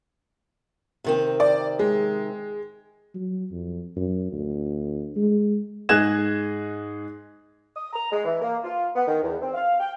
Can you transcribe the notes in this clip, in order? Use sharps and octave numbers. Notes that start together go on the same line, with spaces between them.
C3 D#3 C4
D5
G#3
F#3
F2
F#2
D2
G#3
G#2 G#4 D#5 F#6 G#6 E7
D#6
A#5
G#3
E3
A#3
F4
B3
D#3
E2
C4
F5
G5